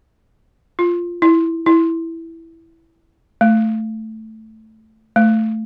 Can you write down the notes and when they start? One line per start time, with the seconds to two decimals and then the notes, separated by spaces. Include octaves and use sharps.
0.79 F4
1.22 E4
1.66 E4
3.41 A3
5.16 A3